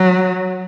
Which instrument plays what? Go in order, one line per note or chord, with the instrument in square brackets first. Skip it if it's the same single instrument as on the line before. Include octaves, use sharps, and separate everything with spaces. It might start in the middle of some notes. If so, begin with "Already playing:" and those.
Already playing: [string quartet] F#3